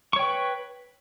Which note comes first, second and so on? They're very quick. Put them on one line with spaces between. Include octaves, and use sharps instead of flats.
C#6 C#5 G5 B4